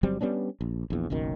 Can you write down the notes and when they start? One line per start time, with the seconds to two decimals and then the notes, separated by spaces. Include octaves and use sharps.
0.03 G1 F#3 G3 C4
0.21 G3 B3 C#4 D4
0.61 A#1
0.90 A#1 E2
1.10 F#1 B1 F#2 D#3